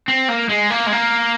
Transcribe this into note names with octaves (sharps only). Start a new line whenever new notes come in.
C4
A#3
G#3
A#3
G#3
A#3